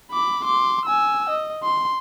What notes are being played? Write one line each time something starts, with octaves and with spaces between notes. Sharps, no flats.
B5 D6
C6 D6
G#5 E6
D#5
C6